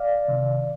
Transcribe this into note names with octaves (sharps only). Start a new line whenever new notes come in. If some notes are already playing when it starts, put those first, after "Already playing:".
Already playing: D5 F5
C3 D#3